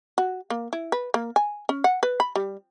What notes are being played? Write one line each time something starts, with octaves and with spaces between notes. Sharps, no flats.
F#4
A#3
E4
B4
A#3
G#5
C#4
F#5
B4
B5
G3